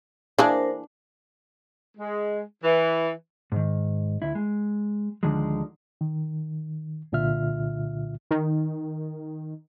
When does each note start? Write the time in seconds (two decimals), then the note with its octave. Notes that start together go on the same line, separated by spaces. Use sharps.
0.39 E3 A#3 D4 G#4 A#4 C5
1.98 G#3
2.63 E3
3.52 G#2 D#3
4.22 D2 E4
4.35 G#3
5.23 D2 D3 D#3 F3 G#3
6.01 D#3
7.12 C2 A#2 D3 F4 E5 F6
8.31 D#3